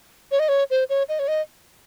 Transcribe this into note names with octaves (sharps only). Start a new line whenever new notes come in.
C#5
D#5
C#5
C5
C#5
D#5
C#5
D#5